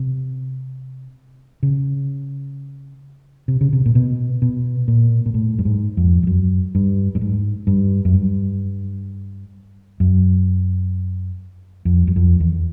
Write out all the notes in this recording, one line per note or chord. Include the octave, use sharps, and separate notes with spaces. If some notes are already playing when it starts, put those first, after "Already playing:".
Already playing: C3
C#3
C3
C#3
C3
A#2
B2
B2
A#2
A#2
A2
G2
G#2
F2
F2
F#2
G2
G2
G#2
G2
F#2
G2
F#2
F2
F#2
F2
E2